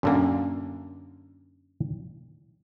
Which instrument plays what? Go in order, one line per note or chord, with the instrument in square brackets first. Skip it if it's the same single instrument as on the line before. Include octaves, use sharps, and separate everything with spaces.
[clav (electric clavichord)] F#2 D3 A#3 [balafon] C4 C#4 D5